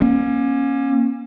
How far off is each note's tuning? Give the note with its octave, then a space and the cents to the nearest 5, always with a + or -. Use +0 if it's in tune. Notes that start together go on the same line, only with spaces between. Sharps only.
A#3 +35 C#4 -15